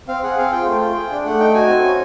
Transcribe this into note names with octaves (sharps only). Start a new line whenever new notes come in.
C4 F5
G#4 F#5
C4 F5
F4 G5
A3
F4
G#4
D4
A3 F#5
D#4 G5
F#4 G#5
C4
C#4